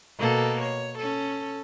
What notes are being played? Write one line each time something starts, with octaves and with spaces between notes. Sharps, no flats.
B2 A#3 A4
C#5
C#4 A4